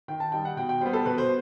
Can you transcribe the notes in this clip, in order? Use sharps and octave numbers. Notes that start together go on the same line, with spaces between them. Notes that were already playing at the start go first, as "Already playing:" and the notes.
D#3 G5
A5
G3 D#4 G5
F#5
B2 G5
G5
G3 B3 C5
A4
B2 B4
C5